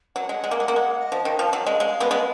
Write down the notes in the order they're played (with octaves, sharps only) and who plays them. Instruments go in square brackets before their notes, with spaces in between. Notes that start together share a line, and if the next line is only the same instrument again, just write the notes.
[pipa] F#3 [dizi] F#5
[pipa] G#3
G#3
[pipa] A#3 [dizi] G#5
[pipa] G#3 [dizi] F#5
[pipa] A#3
G#3
[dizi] F5
D#5
[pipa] F3
D#3
[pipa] F3 [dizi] F5
[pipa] F#3
G#3
[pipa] G#3 [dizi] F5
[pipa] G#3 B3
[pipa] G#3 B3 [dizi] F5